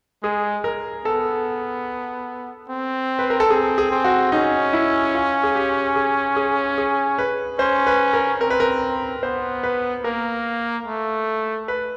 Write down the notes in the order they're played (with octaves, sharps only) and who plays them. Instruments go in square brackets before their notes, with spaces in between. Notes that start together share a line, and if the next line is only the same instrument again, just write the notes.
[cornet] G#3 [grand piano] G#4
[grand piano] A#4
[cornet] B3 [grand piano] A4
[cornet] C4
[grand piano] B4
A#4
A4
[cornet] C4 [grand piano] G#4
[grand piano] G#4
[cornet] C4
[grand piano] F#4
[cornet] C#4 [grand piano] D#4
[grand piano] E4
F4
G#4
G4
G#4
G#4
G#4
B4
[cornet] C#4 [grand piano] C5
[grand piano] B4
A#4
[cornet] C4 [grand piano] A#4
[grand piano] B4
A#4
[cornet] B3 [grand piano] C5
[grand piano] B4
[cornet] A#3 [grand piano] A#4
[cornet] A3
[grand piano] B4